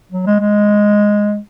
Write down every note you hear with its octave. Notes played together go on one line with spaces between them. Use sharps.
F#3
G#3
G#3